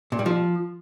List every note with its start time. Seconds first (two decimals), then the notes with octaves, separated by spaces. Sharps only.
0.12 A#2
0.19 G3
0.26 F3